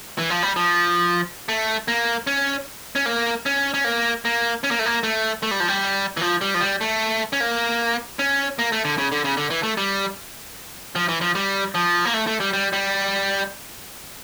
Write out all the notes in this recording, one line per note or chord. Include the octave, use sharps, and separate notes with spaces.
E3
F3
G3
F3
A3
A#3
C#4
C#4
A#3
C#4
C#4
A#3
A#3
C#4
A#3
A3
A#3
A3
A3
G3
F3
G3
E3
F3
G3
F3
G3
A3
C#4
A#3
C#4
A#3
A3
D3
C#3
D3
C#3
D3
E3
A3
G3
F3
E3
F3
G3
F3
A#3
A3
A3
G3
G3
G3